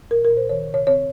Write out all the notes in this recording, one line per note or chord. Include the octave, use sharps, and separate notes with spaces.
A#2 A#4
A#4
A#2
C5
D#3 C#5
C3
C#5
C4 C#5